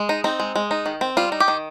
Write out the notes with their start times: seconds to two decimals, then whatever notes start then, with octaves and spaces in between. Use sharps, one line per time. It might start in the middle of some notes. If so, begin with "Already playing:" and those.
Already playing: G#3
0.09 D#4
0.24 C4 D#4
0.40 G#3
0.56 G#3
0.71 D#4
0.86 D#3
1.01 C4
1.17 G3 F4
1.32 D#4
1.40 G4
1.48 D#3